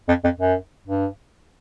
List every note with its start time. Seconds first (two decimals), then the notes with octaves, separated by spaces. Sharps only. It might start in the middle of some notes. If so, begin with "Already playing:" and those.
0.08 F2
0.24 F2
0.40 F#2
0.87 G2